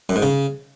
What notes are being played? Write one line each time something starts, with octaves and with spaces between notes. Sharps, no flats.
F#2
G#2
C#3